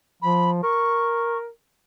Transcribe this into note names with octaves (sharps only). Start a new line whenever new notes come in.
F3 B5
A#4 C#6